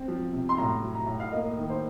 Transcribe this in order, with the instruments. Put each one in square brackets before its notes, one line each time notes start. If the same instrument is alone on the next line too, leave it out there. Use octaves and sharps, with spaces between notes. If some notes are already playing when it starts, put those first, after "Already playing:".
Already playing: [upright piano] C4
F3
C3
C6
A2 A#5
F#3
A#5
A2
F5
A#3 D#5
D#3
C5